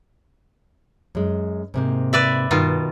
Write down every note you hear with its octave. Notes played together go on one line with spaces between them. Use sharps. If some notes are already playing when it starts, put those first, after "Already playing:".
F#2 G#3
G#2 C3 A#3
B4 D5 E5
G2 B2 D#3 F4